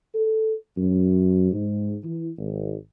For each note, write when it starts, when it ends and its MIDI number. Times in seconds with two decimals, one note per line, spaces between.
0.15 0.54 69
0.78 1.50 42
1.52 1.96 44
2.04 2.30 52
2.38 2.76 32